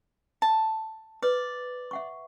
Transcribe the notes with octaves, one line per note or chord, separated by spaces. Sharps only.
A5
B4 D5
E5 F#5 C#6